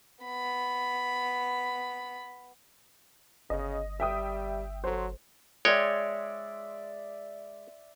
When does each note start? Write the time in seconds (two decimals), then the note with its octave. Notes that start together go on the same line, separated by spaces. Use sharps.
0.25 B3 B5
3.50 G1 C#3 D#5
4.00 G3 E5 G5 D#6
4.84 F#3 A4 C5
5.65 G#3 C#5 D5 E5 G5 C6